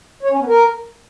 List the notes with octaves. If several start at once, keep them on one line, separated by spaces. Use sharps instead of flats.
C#5
C#4
B3
A#4